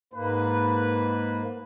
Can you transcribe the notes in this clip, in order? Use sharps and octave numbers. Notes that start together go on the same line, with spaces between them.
G#2 A#3 B4